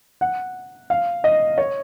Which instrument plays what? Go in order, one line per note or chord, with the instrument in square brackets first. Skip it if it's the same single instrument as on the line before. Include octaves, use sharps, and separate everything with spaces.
[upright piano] F#5
F5
D#5
C#5